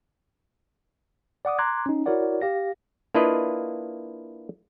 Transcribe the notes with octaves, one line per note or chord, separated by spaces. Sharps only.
D5 F#5 D6 D#6
A#5 C6 D6 F#6 G#6
C#4 D#4
E4 F#4 A#4 C#5 D5 F#5
G4 F5 A#6
A#3 D4 E4 F4 B4 D#5